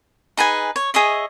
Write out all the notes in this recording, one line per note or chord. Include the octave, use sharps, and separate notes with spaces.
D#4 G#4 B4 G#5
C#5
G#4 C#5 D#5 E5